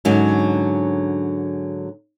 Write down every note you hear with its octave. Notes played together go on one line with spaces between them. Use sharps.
G#2 D3 F#3 C#4